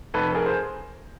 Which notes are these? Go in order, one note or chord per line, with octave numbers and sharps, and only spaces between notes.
F1 A4 B4
A4
G#4 A#4
C5